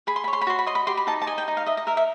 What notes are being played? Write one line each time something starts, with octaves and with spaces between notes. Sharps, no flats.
G#4 B5
C6
B5
C#5
C6
B5
F#4 C6
B5
D#5 C6
B5
G4 C6
B5
D#4 A5
A5
D#5 G#5
G5
D#4
F5
D#5 E5
D#5
A#4 E5
E5